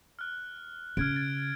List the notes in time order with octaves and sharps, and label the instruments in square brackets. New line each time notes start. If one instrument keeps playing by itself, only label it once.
[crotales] F6 F#6
[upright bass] C#3 [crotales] F6 G#6 D7
[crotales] G#6 A6